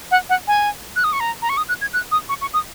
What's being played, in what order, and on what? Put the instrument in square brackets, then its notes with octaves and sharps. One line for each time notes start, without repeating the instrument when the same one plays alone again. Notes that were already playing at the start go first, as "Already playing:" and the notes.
[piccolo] F#5
F#5
G#5
F#6
D#6
C#6
A#5
A#5
C#6
D#6
F#6
G#6
F#6
D#6
C#6
C#6
D#6